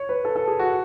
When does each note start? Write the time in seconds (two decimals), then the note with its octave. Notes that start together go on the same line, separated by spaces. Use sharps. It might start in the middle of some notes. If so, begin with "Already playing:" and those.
Already playing: C#5
0.09 B4
0.25 A4
0.36 A4
0.47 G#4
0.59 F#4